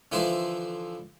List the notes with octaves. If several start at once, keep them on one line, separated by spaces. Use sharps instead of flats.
D3 E3 F3 E4 B4 C5